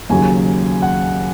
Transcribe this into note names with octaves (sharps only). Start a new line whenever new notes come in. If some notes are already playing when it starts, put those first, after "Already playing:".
D#2 C#3 F#3 G#5
F#5